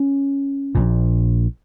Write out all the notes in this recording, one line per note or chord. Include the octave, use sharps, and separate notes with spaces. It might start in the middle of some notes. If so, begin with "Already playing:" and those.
Already playing: C#4
A#1 A#2